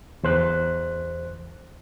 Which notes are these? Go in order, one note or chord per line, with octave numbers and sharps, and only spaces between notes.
E2 C5 F#6